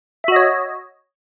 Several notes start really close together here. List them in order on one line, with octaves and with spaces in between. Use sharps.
E5 F#4 D#5 C#5